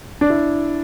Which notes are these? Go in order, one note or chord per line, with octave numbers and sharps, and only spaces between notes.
D4
E4